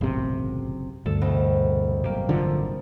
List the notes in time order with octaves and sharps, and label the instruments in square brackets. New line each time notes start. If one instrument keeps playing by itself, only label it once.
[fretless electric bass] F#1 C3 [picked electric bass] B1 E2 A2
[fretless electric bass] D2 [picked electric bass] G2 [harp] A4
[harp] C2 B2 D#5
[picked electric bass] G#1 F#2 [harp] A#3 G4
[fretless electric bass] D3 F3